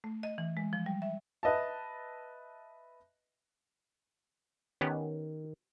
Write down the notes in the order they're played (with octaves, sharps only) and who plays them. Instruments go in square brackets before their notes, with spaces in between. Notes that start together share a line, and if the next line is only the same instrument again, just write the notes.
[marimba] A3
D#5
E3
G#3
F3
G3
E5
[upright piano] B4 D#5 E5 A5
[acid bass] D#3 [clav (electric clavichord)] B3 C#4 G4